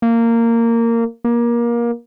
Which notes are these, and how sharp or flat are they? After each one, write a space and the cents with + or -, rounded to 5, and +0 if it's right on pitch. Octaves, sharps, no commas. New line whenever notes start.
A#3 -15
A#3 +25